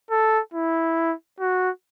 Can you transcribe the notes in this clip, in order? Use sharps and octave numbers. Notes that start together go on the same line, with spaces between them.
A4
E4
F#4